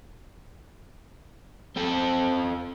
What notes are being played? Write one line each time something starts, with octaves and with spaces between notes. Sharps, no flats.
C4 A4